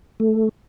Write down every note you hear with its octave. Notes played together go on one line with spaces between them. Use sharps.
A3